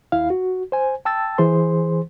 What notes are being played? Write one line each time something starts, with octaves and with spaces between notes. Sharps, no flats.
D#2 E4 F5
F#4
C5 G#5
G5 A5 E6 A6
E3 G#4 C5 C6